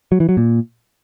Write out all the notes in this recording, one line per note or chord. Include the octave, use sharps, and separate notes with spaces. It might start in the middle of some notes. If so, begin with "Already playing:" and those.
F#3
E3
F#3
A#2